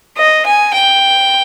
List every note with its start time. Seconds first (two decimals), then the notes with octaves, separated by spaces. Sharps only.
0.17 D#5
0.46 G#5
0.74 G5